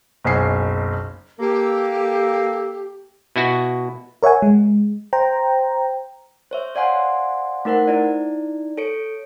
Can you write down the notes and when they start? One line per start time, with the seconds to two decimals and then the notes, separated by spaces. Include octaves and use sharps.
0.25 F#1 B1 G#5 C7
1.40 A#3 G4 A4
3.36 B2 E4 F#4
4.23 A#4 C#5 E5 F#5 G#5
4.42 G#3
5.13 C5 G5 A#5
6.51 C5 C#5 E5
6.75 C5 D5 F5 F#5 G#5 C6
7.65 A3 D#4 A#4 C5 F#5
7.87 D#4 E4 D5
8.78 A4 C#5 C#7 D7